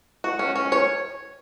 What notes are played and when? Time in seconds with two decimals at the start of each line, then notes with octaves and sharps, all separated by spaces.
0.24 F#4
0.39 C#4
0.56 C#4
0.72 C#5